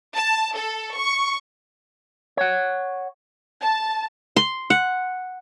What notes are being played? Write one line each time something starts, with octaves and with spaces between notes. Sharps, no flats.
A5
A4
C#6
C#5 F#5
A5
C6
F#5